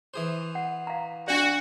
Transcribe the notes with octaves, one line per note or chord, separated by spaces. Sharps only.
E3 G#4 C5
F#5
F5 A#5
D4 F#4 D5